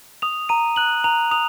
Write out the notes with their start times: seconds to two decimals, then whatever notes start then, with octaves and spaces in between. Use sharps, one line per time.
0.22 D#6 F7
0.49 A#5 D#7
0.76 F#6 F#7
1.04 A#5 F7
1.31 D#6 F7